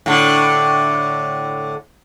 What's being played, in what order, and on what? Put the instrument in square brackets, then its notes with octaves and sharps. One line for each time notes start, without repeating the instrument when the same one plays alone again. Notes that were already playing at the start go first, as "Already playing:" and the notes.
[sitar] A2 D3